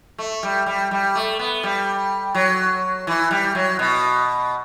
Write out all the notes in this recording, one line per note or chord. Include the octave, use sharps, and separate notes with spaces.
A3
G3
G3
G3
A3
B3
G3
F#3
E3
G3
F#3
B2